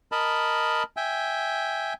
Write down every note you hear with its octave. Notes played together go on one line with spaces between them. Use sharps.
A#4 D#5 A5 B5
E5 G5 G#5